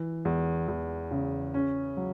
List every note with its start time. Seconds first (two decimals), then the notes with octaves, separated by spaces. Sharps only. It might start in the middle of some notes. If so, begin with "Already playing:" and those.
Already playing: E3
0.25 E2
0.68 E2
1.11 C#3
1.54 C#4
1.97 F#3